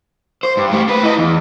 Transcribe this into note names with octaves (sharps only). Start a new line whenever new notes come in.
C5
G2
A3 G4
C4 B4
E4 D#5
E2